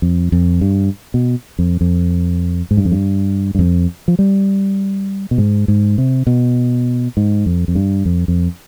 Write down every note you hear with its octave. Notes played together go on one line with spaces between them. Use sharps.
F2
F2
G2
B2
F2
F2
G#2
G2
F2
G2
G2
F2
F3
G3
B2
G#2
G#2
C3
B2
G#2
F2
F2
G2
F2
F2